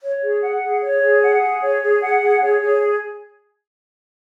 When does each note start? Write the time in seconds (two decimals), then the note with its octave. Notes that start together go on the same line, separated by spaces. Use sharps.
0.03 C#5
0.23 G#4
0.43 F#5
0.63 G#4
0.83 C#5
1.03 G#4
1.22 F#5
1.42 G#4
1.62 C#5
1.82 G#4
2.02 F#5
2.21 G#4
2.42 C#5
2.61 G#4